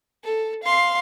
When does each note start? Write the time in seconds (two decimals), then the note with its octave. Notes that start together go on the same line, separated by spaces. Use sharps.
0.24 A4
0.63 F5 C6